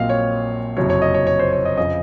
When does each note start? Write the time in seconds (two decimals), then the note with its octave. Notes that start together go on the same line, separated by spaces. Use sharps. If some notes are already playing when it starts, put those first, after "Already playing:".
Already playing: A#1 A#2 F#3 C4 D#5 F5
0.09 C#5
0.77 F#1 F2 C3 F#3 C#5
0.90 C#5
1.02 D#5
1.14 C#5
1.27 C#5
1.39 C5
1.52 C#5
1.65 D#5
1.77 F2 C#3 F3 D#5